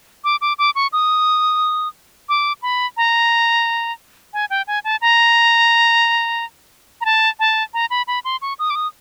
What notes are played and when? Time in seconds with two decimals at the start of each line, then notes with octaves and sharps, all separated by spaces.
0.24 D6
0.41 D6
0.59 D6
0.75 C#6
0.93 D#6
2.29 D6
2.62 B5
2.97 A#5
4.33 G#5
4.50 G5
4.67 G#5
4.84 A5
5.01 A#5
7.01 A#5
7.05 A5
7.39 A5
7.74 A#5
7.90 B5
8.07 B5
8.25 C6
8.42 C#6
8.59 D#6
8.70 D6
8.75 D#6